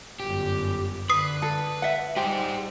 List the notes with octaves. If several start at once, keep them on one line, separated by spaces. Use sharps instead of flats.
G1 F#2 G4
D3 B4 D#6 C7
A4
E5 F#5
G3 D#4 G4 G#4 C5